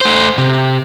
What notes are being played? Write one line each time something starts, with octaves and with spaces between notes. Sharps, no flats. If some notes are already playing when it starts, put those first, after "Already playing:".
A3 C5
C3